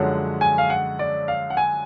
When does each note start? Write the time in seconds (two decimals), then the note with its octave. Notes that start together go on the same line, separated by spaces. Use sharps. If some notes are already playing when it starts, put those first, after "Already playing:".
Already playing: F#2 D3 F3 G#3 C#4 F#5
0.41 G#5
0.58 F5
0.70 F#5
0.99 D5
1.28 F5
1.50 F#5
1.57 G#5